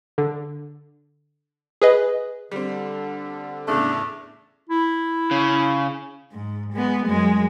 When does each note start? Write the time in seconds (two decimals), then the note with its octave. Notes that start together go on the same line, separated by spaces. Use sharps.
0.18 D3
1.82 G#4 B4 D#5
2.51 D3 G3 C4
3.68 E2 A2 C#3 A3 D4
4.69 E4
5.31 C#3
6.32 G#2
6.73 G#3 B3
7.07 F#2 G#3